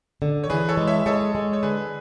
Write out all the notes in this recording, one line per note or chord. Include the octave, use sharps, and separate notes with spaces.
D3
C#5
E3 G#4 B4
A4 C#5
G#3
C#5 E5
G#3 A4 C#5
G#3
C#5
D3 G#4 B4